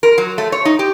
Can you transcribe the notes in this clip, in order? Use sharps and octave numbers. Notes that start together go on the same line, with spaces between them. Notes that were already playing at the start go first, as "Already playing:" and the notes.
A#4
F#3
A3
C#5
D#4
G4